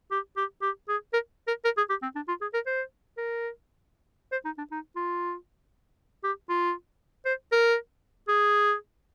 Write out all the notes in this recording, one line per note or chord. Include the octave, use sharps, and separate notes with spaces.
G4
G4
G4
G#4
A#4
A#4
A#4
G#4
G4
C4
D4
F4
G#4
A#4
C5
A#4
C5
D#4
D4
D#4
F4
G4
F4
C5
A#4
G#4